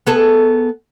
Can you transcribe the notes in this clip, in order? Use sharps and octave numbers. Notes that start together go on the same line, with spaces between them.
B3 G#4 A4